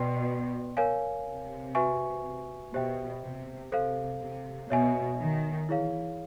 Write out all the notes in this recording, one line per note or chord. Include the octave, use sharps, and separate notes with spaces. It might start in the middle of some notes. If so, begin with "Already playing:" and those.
Already playing: B2 B4 D5 G5 C6
A#4 C#5 F5 G#5
C3
F#4 B4 E5 G#5 C#6
B2 G4 C5 E5 G5
C3
C3 A4 C5 F5
C3
B2 C#5 E5 G#5
D#3
E3 E4 G#4 C#5 F5